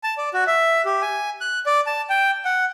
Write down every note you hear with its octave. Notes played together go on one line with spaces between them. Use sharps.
A5
D5
F#4
E5
G4
G#5
F#6
D5
A5
G5
F#5